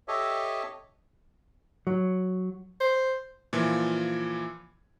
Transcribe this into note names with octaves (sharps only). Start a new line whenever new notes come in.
G4 A4 C#5 D#5 E5
F#3
C5
A#2 E3 F3